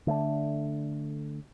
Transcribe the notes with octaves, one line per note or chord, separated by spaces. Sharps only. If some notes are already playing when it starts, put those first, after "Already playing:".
D3 A3 B3 D4